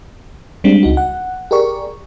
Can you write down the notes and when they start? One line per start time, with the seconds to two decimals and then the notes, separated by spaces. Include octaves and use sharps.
0.64 G3 G#3 C4 D4
0.83 C#2 D#4 F#4
0.97 F#5
1.51 G4 G#4 A#4 D5 C#6